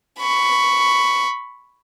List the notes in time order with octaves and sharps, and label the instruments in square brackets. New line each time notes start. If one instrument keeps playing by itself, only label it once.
[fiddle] B5 C#6